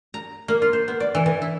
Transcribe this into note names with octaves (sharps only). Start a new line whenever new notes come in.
A#5
A#3
F4
C5
B3
D5
E3
E3
E4